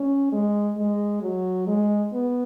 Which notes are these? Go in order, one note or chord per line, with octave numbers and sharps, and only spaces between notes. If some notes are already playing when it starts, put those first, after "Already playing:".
Already playing: C#4
G#3
G#3
F#3
G#3
B3